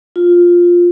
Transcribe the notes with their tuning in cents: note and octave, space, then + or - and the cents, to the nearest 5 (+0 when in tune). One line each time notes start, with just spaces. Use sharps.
F4 +5